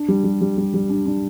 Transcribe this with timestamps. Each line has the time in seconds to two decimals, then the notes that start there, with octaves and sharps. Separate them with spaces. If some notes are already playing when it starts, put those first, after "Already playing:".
Already playing: D4
0.08 G3
0.24 G3
0.41 G3
0.58 G3
0.74 G3
0.89 D4
1.06 D4